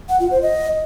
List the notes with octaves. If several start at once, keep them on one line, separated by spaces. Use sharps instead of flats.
F#5
F4
C5
D#5